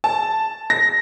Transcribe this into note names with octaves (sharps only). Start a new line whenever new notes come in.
A5
A#6